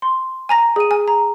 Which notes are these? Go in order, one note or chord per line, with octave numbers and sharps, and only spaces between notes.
C6
G#5 A#5 A#6
G#4 D#7
G#5
A#5